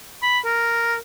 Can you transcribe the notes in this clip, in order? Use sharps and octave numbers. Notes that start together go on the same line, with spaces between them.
B5
A#4